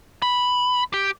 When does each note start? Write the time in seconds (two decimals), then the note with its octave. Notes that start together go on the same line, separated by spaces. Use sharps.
0.22 B5
0.94 G4